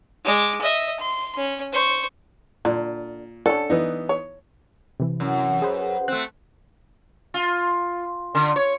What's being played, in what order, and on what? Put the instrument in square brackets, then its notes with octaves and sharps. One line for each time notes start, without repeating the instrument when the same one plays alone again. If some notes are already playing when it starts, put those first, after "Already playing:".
[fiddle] G#3 D6
D#5 E5
C6
C#4
C5 C#6
[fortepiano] A#2 [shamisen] D3
[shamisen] D3 C#4 [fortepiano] A4
[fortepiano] E3 B3 D#4
[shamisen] C#5
[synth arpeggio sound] C3 E3
[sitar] F#2
[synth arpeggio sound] G#4 B4 C5
[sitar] A3 C4 [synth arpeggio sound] F#6
[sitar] F4
D3
C#5